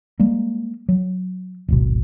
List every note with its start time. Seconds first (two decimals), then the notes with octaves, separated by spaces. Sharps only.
0.20 G3 G#3 A#3
0.89 F#3
1.68 D1 G#1 B2